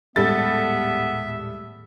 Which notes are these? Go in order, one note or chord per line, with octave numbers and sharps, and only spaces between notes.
D#1 A2 G3 G#3 B3 A4 E5 A6